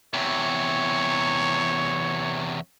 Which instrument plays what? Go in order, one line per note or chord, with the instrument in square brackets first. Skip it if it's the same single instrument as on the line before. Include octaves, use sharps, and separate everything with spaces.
[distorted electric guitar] E2 C3 [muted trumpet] C#5